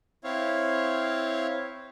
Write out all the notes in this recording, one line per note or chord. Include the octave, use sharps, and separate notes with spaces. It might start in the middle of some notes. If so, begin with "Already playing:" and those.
C4 E4 C#5 F5